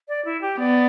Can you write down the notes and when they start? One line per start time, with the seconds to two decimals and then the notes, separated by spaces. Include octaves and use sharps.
0.08 D5
0.25 E4
0.42 G4
0.59 B3 D5